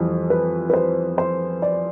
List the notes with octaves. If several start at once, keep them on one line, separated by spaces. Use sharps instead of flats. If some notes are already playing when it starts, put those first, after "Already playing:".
Already playing: F2 E3 G3
B4
B4
C5
C5
D5